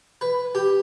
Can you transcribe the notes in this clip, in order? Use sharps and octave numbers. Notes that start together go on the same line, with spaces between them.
B4
G4